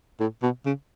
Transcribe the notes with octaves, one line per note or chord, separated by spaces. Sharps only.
A2
B2
C#3